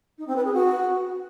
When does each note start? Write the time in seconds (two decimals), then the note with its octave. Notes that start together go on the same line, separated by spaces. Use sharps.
0.18 D#4
0.27 C4
0.36 B4
0.45 G#4
0.54 F#4